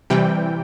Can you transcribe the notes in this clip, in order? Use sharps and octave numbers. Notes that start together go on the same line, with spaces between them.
C3 E3 G3 G5